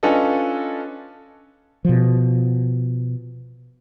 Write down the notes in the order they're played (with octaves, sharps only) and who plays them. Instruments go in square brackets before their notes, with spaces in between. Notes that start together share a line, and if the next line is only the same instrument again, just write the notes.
[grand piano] C#4 D4 F4 A4 B4 D#5
[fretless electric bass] B2 F3